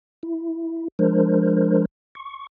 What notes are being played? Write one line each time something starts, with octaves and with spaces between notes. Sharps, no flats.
E4
F3 G#3 D4 A#4 C5
C#6